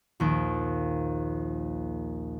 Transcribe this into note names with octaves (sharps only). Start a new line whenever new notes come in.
A#1 D#2 D7